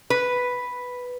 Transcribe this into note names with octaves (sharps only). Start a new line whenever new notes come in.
B4